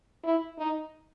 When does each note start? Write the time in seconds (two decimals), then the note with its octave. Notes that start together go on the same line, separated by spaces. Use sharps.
0.24 E4
0.58 D#4